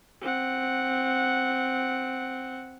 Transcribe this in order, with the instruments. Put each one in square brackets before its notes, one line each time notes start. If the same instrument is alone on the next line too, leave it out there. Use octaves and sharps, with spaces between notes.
[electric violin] C4 F#5